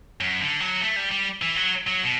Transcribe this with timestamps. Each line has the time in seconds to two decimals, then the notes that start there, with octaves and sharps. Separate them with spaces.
0.21 F#2
0.41 D3
0.60 F#3
0.81 A3
0.96 G3
1.11 G3
1.42 E3
1.56 F#3
1.87 F#3
2.03 B2